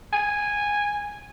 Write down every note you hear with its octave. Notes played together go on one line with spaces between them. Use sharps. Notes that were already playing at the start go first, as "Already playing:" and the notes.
G#5